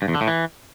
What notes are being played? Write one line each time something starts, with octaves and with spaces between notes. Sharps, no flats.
G2
E2
D3
A2
E3